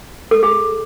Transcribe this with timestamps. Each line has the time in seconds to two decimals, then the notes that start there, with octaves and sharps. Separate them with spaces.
0.31 A4
0.43 G#4